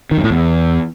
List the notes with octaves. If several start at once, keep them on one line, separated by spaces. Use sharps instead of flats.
D#3
F#2
A2
E2